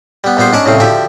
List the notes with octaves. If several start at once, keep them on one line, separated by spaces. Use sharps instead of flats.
G3 B3
A#1 G3 B3 C5 C6
G#2 C#4 D4 C#5 D5 A5
C2 A2 C#3 C4 F5
D2 F3 G4 E5